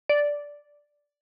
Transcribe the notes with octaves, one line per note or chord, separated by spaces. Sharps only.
D5